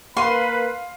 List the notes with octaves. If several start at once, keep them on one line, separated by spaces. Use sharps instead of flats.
A#3 A#4 B4 F5 B5 C6 D#7